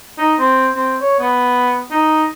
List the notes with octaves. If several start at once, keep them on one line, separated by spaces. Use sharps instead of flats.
D#4
C4
C4
C#5
B3
D#4